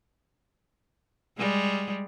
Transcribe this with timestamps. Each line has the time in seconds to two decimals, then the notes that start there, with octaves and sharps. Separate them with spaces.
1.38 G3 G#3